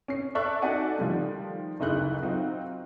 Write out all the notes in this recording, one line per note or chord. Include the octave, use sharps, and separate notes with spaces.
C#4 C7
A4 D5 E5 C#6 F#6
D#4 F#4 A4 D5 F#5 G#5
D#3 F3 G3 A3
F#1 D2 C#3 D#4 E4 F#6
F#3 C4 D#4 F4